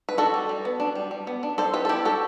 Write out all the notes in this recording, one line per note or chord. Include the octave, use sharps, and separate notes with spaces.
B4
D4 F#4 A4
G3
G3
B3
D4
G3
G3
B3
D4
G3 A4 C5
G3 G4 B4
A4
B3 E4 G4
D4 F#4 A4